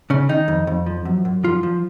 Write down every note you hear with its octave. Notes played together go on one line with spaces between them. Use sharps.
C#3 C#4
D#3 D#4
F2
F2
F3
F#2
F#2
F3 F4
F3